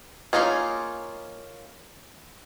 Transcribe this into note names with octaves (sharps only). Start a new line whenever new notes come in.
A#3 C#4 D#4 F4 G#4